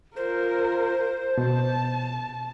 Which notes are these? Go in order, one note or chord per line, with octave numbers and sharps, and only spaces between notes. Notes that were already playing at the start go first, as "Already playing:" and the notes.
F4 A#4 C5
B2 A5